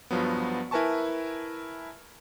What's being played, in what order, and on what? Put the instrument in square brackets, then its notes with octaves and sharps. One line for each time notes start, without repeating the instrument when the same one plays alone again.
[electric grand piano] G2 F3 F#3 B3
E4 A#4 B4 G#5 A5 C#6